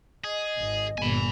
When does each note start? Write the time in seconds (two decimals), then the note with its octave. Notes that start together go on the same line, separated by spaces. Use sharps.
0.24 G#4 D#5
0.58 G#1
0.98 G1 A#2 G#5 B5